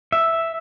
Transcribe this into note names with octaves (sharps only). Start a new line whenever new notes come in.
E5